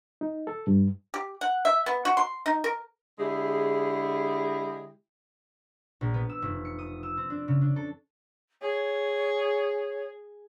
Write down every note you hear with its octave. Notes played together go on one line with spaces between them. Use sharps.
D#4
A4
G2
G4
F#5
E5
B3
F#4
C6
D#4
A#4
D3 G#3 E4 G4 G#4
A#1
B3
E6
F1
C#7
D#6
E6
C4
D4
C#3
D4
A4
G#4 C#5